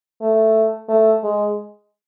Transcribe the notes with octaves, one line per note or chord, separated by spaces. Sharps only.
A3
A3
G#3